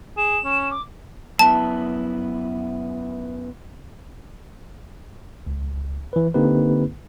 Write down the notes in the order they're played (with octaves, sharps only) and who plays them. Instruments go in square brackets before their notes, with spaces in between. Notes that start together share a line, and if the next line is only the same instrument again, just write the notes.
[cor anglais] G#4 [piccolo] E7
[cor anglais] C#4
[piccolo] D6
[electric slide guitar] F#2 B3 E4 [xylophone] A5
[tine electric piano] C#2
E3 B4
D3 A#3 C4 D#4 G4 B4